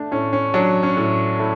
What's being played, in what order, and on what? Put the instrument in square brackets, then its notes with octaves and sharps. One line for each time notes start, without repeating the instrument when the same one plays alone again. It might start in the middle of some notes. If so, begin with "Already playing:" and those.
Already playing: [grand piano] A3 D4
A2 C#4
C#4
F#3 D4
C#4
A2
A3 E4